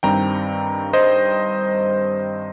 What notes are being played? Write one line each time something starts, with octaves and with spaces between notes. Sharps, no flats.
G2 D#3 G3 C4 G5 A#5
C5 D#5